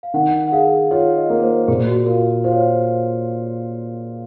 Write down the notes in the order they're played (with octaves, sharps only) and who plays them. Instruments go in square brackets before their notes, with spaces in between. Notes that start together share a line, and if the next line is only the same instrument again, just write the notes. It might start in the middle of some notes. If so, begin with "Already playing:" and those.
[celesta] F5
[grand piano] D#3 [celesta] F#5
[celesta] F#5
[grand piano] G#4 [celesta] F5
[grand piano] F4 [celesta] C#5
[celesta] D#5
[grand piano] A#3
[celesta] A#4
C5
[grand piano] A#2 [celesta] G#4
[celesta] F#4
[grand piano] F4 [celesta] A#4
[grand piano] F4 [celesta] C5
[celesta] C#5
C5